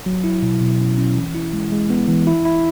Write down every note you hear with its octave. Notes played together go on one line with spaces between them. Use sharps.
F#3
E4
B2
B2
C#4
C#4
E3
E4
G#3
G#3
B3
E3
E4
E4